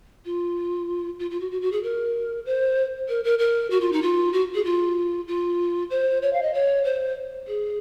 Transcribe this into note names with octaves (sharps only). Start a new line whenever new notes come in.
F4
F4
F4
F#4
F#4
F#4
G#4
A#4
C5
A#4
A#4
A#4
F#4
F4
D#4
F4
F#4
G#4
F4
F4
C5
C#5
F5
D#5
C#5
C5
G#4